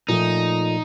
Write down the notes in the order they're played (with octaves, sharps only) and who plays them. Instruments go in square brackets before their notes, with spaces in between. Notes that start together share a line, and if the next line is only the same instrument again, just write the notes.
[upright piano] A#2 F3 A3 [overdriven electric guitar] D#4